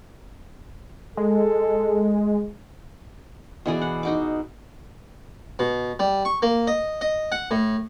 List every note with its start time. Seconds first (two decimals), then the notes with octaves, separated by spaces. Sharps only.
1.17 G#3 A4
3.66 B2 E3 G#4 D5
3.81 F#5
4.03 D#4 F#4 D6
5.59 B2
5.99 G3
6.25 C#6
6.42 A#3
6.67 D#5
7.01 D#5
7.32 F#5
7.51 A2